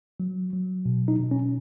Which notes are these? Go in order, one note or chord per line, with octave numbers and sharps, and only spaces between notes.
F#3
F#3
B2
D#4
B2
C#4